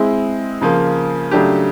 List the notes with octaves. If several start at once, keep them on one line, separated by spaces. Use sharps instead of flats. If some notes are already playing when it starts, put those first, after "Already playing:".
Already playing: G#3 C4 E4
C#3 F3 A#3
C#3 F#3 A3 D4 G4